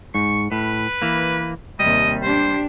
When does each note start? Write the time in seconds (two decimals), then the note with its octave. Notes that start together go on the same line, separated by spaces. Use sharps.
0.15 G#2 C#6
0.52 A2 B4
1.02 E3 A#3
1.80 D#2 C3 G3 D#5
2.23 D4 G4 C5